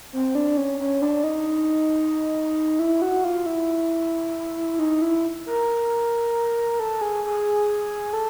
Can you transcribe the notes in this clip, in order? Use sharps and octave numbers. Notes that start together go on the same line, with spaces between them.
C4
D4
C#4
C#4
D4
D#4
E4
F#4
F4
E4
D#4
E4
A#4
A4
G#4
G#4
A4